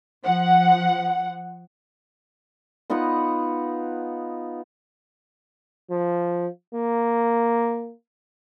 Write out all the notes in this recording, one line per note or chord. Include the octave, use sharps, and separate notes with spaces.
F3 F#5
B3 D#4 F4 F#5
F3
A#3